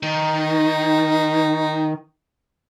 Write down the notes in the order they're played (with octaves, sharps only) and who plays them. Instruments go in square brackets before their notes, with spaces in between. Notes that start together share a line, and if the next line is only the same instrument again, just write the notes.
[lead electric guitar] D#3 [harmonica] D#4